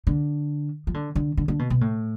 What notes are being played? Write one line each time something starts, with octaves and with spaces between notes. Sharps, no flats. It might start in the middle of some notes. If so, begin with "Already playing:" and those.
D3
F3
D3
D3
D3
D3
B2
B2
A2